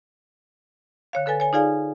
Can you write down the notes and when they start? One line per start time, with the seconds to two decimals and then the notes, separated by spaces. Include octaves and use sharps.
1.13 D3 C#5 F5
1.26 D3 A4 B4 G#5 A6
1.40 C#5 G#5
1.53 D#4 F4 G#4 D5 F5 G#5